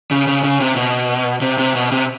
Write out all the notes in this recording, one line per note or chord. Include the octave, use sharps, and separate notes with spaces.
C#3
C#3
C#3
C3
B2
C3
C3
B2
C3